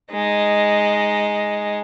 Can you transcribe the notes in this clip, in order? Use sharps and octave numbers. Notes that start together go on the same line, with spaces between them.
G#3 D#4